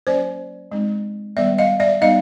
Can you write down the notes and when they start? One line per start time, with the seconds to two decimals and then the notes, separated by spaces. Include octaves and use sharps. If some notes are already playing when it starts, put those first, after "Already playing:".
0.07 F#3 A#3 C#4 C5 D5
0.72 G#3 C4 D#4
1.37 D#3 G3 B3 D5 E5
1.58 D#5 F5
1.80 D5 E5
2.01 G3 B3 D#4 D#5 F5